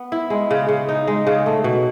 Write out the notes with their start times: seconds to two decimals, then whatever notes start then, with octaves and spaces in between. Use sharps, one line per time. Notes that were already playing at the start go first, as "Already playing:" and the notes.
Already playing: B3
0.12 E4
0.30 G#3
0.51 C#3
0.69 C#3
0.89 D#4
1.07 G#3
1.27 C#3
1.46 A3
1.64 B2